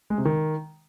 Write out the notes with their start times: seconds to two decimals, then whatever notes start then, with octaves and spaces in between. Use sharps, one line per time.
0.10 G#3
0.18 C3
0.25 D#3